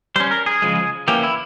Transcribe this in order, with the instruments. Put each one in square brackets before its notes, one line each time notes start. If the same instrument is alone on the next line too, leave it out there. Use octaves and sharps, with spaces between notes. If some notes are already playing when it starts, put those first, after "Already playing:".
[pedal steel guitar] G3 C#4 C5
A#4
G#4
C#3 F3 G#3
E3 A#3 C#4 G4
E4